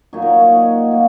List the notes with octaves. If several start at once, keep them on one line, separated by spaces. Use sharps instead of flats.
A#2 F#3 D#4 C#5
A#4
C#5
D#5
F#5
A#2 A#3